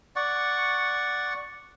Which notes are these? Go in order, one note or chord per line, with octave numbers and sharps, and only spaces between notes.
D5 F#5 C#6